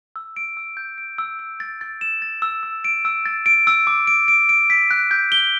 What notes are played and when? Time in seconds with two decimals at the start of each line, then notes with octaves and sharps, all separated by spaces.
0.16 E6
0.36 D7
0.57 E6
0.77 G6
0.98 D7
1.18 E6
1.39 E6
1.60 A6
1.81 A6
2.01 E7
2.22 A6
2.42 E6
2.63 E6
2.84 D7
3.05 E6
3.26 A6
3.46 D7
3.67 E6
3.87 D6
4.07 D7
4.28 D7
4.49 D7
4.70 B6
4.91 F#6
5.11 G6
5.32 G7